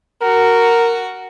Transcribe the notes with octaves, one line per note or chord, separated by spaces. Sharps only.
F#4 A#4